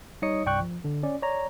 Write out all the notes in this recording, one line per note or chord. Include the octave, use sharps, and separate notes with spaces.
G3 D#4 C#5 D#5 D#6 C#7
C2 G2 D5 G5 C#6 F#6
F3
D3
C#4 D5
C#5 D5 A#5